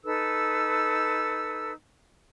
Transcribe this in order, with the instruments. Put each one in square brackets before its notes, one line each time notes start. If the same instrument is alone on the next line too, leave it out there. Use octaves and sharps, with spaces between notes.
[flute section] D#4 A4 B4 E6